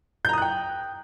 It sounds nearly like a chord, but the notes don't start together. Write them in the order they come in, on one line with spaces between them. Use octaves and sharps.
G6 A#5 D#6 F#6 G5